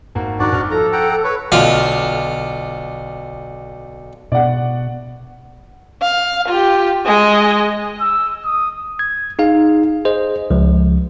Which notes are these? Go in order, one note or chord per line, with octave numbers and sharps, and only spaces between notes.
G#1 A#3 F#4
G#1 D#3 D4 F#4 A#4 D5
G#1 F6
F3 A4 A#5
F#5 G5 A#5
B4 C#5
B1 D3 F4 F5
B2 D5 F#5
F5
F4 G4
G#3 D#5
E6
D#6
G#6
D#4 G#4 F5
G#4 C5 D#5
C#2 F3